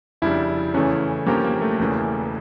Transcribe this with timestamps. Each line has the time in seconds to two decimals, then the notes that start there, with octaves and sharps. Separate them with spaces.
0.22 F1 F2 C#3 G3 D4 E4
0.74 E2 C#3 E3 A3 C#4
1.26 G2 F3 A#3 C#4 G4 A#4
1.44 A#3
1.62 A3
1.79 E1 E2 C#3 E3